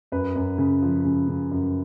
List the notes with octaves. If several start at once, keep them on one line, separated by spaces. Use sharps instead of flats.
F#2 B4
F#2
C#3
F3
C#3
C#3
F#2